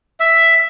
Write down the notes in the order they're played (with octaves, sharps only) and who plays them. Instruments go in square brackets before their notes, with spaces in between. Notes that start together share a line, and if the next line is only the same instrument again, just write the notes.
[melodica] E5